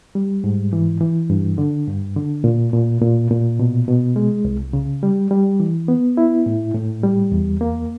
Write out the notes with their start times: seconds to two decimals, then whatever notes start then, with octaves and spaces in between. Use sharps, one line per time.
0.15 G3
0.44 G#2
0.73 E3
1.01 E3
1.30 G2
1.58 D3
1.87 G2
2.16 D3
2.44 A#2
2.73 A#2
3.01 A#2
3.31 A#2
3.60 B2
3.88 B2
4.16 G#3
4.45 C2
4.73 C#3
5.03 G3
5.31 G3
5.60 E3
5.88 B3
6.17 E4
6.46 A2
6.74 A2
7.03 G3
7.32 E2
7.61 A#3